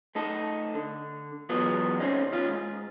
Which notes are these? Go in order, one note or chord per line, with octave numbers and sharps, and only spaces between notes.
A3 D#4 A4
D3
E3 F#3 G#3 B3 F4
C#3 C4 C#4 D#4
D#3 C#4 F4
G#2